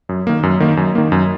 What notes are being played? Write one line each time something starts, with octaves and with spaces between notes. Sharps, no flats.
F#2
D#3 A#3
F#2
D#3 A#3
F#2
D#3 A#3
F#2